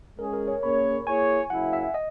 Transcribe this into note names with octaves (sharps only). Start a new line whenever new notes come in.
G#3 C#4 G#4 A#4
A#4
C#5
A#3 C#4 G#4 C#5 B5
A#3 E4 G#4 C#5 G#5
C#3 F#3 A#3 E4 F#5
E5
D#5